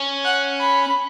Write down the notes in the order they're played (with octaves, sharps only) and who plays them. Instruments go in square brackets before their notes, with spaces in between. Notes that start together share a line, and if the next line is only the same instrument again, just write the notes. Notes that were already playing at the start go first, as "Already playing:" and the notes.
Already playing: [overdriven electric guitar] C#4
[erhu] F#5
B5